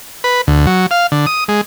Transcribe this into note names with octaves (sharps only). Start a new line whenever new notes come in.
B4
D2
F#3
F5
D3
D#6
G#3